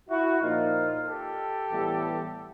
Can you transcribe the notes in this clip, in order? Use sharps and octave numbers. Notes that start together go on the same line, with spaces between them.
E4 F#4
A#2 F3 A#3 D#4 F4
G4 A4
A2 E3 G3 B3